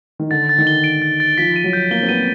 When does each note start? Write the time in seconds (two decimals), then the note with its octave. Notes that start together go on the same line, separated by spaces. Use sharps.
0.19 D#3
0.31 D3 A6
0.49 A6
0.58 D#3
0.67 G7
0.84 D7
1.02 A6
1.20 A6
1.38 F3 B6
1.56 D#7
1.64 F#3
1.73 G6
1.91 A#3 G7
2.03 C4
2.09 B3 D#7